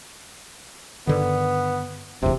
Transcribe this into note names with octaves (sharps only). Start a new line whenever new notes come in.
G2 D3 D#3 B3
F1 A#1 E2 C3